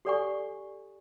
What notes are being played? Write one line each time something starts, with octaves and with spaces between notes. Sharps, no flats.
G4 A4 D5 F#5 G#5 C#6